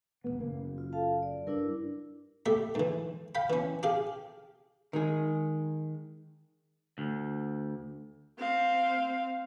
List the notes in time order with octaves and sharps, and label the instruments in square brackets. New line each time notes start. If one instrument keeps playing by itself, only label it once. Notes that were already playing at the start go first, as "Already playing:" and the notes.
[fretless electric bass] E1 D#2 B3
F#1 A#3
[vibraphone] F4
A4 F5 A5
D5
[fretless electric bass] G2 [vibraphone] D4 E4 A#4
[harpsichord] A3 G4 E5
G#2 E3
F5 G5 B5
E3 C#4
G4 G#4 F5
[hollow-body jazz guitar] D#3 G#3 G#4
[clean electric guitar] D2
[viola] C4 F5